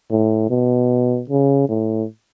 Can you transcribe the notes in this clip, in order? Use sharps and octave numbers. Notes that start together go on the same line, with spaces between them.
A2
B2
C#3
A2